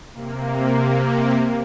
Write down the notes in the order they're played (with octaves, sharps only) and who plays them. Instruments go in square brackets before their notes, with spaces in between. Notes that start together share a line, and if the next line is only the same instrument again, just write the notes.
[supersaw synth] C3 A#3